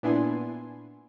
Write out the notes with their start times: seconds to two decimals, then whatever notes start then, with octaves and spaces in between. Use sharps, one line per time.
0.03 A#2 B3 D4 E4 G#5 C6